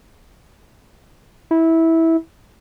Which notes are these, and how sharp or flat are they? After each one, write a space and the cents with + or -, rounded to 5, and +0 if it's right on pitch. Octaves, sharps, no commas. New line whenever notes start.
E4 -15